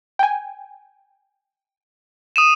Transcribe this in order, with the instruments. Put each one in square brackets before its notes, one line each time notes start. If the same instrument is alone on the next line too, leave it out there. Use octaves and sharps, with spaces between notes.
[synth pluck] G5 G#5
[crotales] D#6 D#7 E7